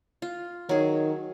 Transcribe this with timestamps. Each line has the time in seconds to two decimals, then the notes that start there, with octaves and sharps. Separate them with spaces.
0.22 F4
0.69 D#3 F#3 G#4